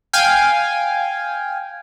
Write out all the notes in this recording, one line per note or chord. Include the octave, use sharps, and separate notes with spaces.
F5 G5 G#5